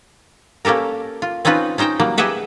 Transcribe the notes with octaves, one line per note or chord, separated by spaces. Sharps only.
A#3 C#4 G4 A4 A#4
F4
C4 C#4 D#4 F4 B4
C#4 D#4 C5 G5 A#5
F#3 G3 A#3
G4 G#4 B4 D#5 E5 F#5